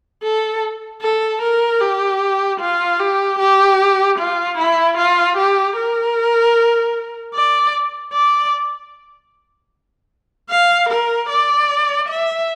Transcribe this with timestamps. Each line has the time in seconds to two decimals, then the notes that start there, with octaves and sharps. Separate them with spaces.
0.23 A4
1.02 A4
1.42 A#4
1.81 G4
2.61 F4
3.00 G4
3.39 G4
4.19 F4
4.58 E4
4.98 F4
5.37 G4
5.76 A#4
7.34 D5
8.13 D5
10.50 F5
10.90 A#4
11.29 D5
12.08 E5